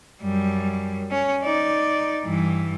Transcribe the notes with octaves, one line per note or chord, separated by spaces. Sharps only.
F#2 G3
C#4 C#5
D#4 D5
G2 E3